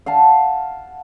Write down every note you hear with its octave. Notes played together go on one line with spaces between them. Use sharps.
F5 F#5 A5